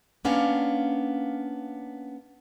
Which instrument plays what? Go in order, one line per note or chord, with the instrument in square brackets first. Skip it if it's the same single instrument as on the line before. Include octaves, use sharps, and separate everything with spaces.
[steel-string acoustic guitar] A#3 B3 C#4 D4 F5